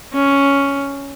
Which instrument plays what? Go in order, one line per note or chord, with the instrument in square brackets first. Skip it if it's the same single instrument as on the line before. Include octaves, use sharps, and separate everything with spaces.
[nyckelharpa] C#4